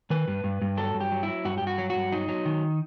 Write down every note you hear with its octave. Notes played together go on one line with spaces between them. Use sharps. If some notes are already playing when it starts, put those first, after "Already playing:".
D#3 B4
G2
G2
G2
F#3 A4
G2
G4
F#3
E4
F#3
G2 F#4
G2 G4
F#4
F#3
F#4
G2
F#3 D#4
F#3
D#3